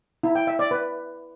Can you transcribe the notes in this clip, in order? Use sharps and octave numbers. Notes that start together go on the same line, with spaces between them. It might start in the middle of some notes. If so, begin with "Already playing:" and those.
E4
G5
E5
D5
B4